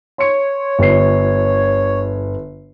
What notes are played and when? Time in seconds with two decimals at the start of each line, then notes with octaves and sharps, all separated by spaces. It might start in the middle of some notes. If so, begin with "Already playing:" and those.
0.18 C#5 C6 C#7
0.79 G1 F4 C7